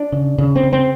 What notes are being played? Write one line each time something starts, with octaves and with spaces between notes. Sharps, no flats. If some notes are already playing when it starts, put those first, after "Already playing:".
Already playing: D4
C#3
C#3
C4
C#3
C4